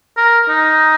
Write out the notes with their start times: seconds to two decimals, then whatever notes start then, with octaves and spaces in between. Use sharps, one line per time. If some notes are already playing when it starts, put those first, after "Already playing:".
0.17 A#4
0.49 D#4